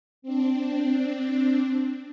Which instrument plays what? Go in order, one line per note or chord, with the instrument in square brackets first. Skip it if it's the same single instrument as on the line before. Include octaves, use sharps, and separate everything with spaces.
[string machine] C4 D4